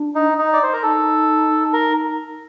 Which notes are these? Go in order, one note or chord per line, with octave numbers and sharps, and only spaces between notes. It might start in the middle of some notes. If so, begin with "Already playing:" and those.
Already playing: D4
D#4
D#4
D5
C5
A#4
D#4 A4
A#4